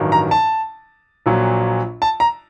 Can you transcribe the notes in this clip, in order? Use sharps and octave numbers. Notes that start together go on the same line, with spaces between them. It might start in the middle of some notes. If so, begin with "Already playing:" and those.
Already playing: A1 G2 D#3 F#3
A#5
A5
A#1 A#2 F#3
A5
A#5